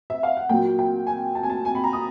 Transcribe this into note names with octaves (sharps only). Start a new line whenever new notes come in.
E5
F5
F#5
A#2 F#3 A#3 G5
G5
G#5
A5
G#5
A5
G#5
B5
A#5
D#6